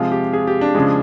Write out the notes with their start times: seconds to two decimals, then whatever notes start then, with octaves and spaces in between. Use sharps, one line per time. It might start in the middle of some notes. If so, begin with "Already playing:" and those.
Already playing: C3 F3 G#3 F4
0.12 G4
0.33 G#4
0.47 G4
0.61 D4
0.75 C#3 F3 G#3